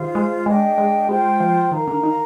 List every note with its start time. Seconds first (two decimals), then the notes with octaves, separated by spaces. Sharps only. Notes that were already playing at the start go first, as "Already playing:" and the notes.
Already playing: D#3 F4 G#4 C5 F5
0.15 G#3
0.46 G#3 D4 G#4 D#5 G5
0.78 G#3
1.09 G#3 F4 C5 G5 C6
1.40 F3
1.71 D#3 A#4 F5 A#5
1.88 D3
2.03 D#3